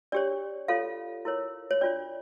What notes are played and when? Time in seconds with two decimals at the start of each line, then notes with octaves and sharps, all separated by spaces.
0.12 D4 G4 C#5 D5
0.68 F4 A4 C#5 F5
1.25 E4 A#4 C#5
1.71 C#5
1.81 D4 F4 C#5 D5